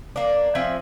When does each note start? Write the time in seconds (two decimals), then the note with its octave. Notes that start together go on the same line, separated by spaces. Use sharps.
0.16 A#3 D4
0.55 F3 C4 E5 G#5